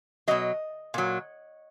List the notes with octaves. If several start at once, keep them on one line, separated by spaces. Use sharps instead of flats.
B2 F#3 D#5
A#2 F#3